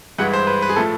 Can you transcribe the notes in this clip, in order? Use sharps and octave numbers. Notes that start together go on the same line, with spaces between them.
G2 E3 G#3 F#5
C5
B4
B4
G#4
A2 F3 A3 A4